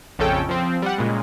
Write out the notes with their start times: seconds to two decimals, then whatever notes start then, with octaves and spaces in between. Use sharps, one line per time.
0.19 A#1 F2 C#3 C#4 A4 G5
0.49 F3 C4
0.82 G3 F#5
0.98 A#2 C#3 G#3